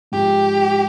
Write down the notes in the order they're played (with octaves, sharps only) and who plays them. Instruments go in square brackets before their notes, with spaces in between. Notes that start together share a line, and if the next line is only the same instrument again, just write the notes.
[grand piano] G#2 F3 G#3 [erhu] G4